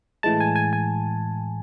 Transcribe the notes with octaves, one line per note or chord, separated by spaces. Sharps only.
A2 E3 G#3 A5
G#5
G#5
G#5